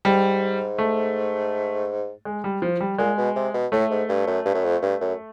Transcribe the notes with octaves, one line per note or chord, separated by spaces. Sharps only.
G#2 G3
A3
G#3
G3
F3
G3
A#2 G#3
B2
C3
B2
A2 A3
G#2
G2
F#2
G2
F#2
F2
G2
F#2